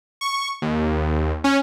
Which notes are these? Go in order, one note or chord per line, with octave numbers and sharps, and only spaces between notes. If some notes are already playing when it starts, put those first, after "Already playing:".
C#6
D#2
C#4